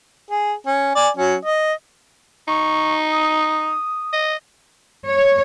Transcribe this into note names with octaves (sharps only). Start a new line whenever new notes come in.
G#4
C#4
D5 G#5
F#3 C#4
D#5
D#4 C#6
D#6
D#5
C#5